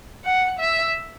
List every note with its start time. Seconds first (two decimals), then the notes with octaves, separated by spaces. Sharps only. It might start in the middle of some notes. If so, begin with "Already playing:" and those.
0.24 F#5
0.59 E5